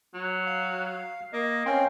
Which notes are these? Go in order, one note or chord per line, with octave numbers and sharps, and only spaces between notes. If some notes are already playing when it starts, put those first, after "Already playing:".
F#3
F5
A#3 D#5
C4 C#4 F5 G5